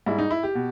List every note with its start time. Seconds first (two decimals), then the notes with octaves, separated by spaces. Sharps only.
0.06 G#2 G3 E4
0.18 D#4
0.31 E4
0.43 G4
0.55 B2